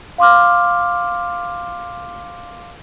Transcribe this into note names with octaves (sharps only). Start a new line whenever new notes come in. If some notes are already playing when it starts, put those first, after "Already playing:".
F5 C6 D6 F6